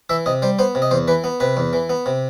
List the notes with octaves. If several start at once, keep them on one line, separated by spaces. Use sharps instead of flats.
E3 E5
C3 D#5
G3 C5
B3 C5
C3
D#5
E2 C5
E3 B4
B3
C3 B4
E2
E3
B3
C3